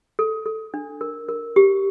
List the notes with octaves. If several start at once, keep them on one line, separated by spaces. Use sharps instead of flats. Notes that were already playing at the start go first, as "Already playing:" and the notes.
A4
A4
D4
A#4
A#4
G4